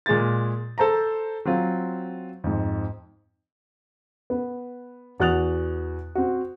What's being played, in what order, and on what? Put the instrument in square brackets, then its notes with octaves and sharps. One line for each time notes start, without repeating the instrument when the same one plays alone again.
[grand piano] A#2 G#3 G#4 A6
A4 C5 A5 A#5
F#3 C4 F4
F2 G#2
[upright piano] B3
E2 F#4 D#6 F#6 A6 F7
C4 F#4